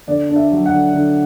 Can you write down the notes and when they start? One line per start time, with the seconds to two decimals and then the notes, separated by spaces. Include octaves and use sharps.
0.07 D3 D5
0.30 D4
0.36 E5
0.51 F#3
0.66 F#5
0.72 D3
0.93 D3